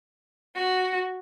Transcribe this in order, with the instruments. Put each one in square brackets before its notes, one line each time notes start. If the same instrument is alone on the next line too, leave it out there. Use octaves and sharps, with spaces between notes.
[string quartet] F#4